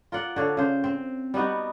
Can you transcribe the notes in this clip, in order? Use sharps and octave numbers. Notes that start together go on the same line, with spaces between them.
F4 A#4 D5 F#5
D3 D4 C#5 F5
C#3 C5
C4
G3 B3 D#4 F#4